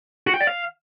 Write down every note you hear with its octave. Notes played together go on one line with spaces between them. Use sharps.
F#4
G5
D5
F5